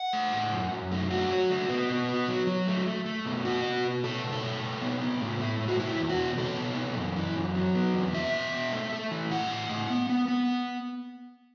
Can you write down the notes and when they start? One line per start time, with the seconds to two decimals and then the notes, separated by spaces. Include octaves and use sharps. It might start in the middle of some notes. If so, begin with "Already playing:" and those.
Already playing: F#5
0.13 A3
0.33 A2
0.52 F#2
0.71 F#2
0.92 A3
1.10 A3 F#4
1.30 F#3
1.50 A3
1.69 B3
1.89 B2
2.09 B3
2.28 F#3
2.47 F#3
2.68 A3
2.86 A3
3.06 A3
3.25 B2
3.45 B3 F#4
3.64 B3
3.85 B2
4.04 A3 A4
4.24 B2
4.33 A4
4.43 A3
4.63 B2
4.81 B3
5.01 B3
5.21 A2
5.41 A3
5.60 A2
5.68 F#4
5.80 B2 E4
5.99 E2
6.09 F#4
6.18 B2
6.38 B2 A4
6.57 B3
6.77 B2
6.96 F#2
7.16 E3
7.36 F#2
7.55 F#3
7.75 B3
7.94 E2
8.13 B2 E5
8.33 B2
8.53 B2
8.73 A3
8.93 A3
9.11 E3
9.31 A2 F#5
9.51 A2
9.69 A2
9.90 B3
10.09 B3
10.28 B3